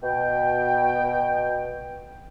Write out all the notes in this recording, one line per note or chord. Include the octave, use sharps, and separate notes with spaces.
B2 G5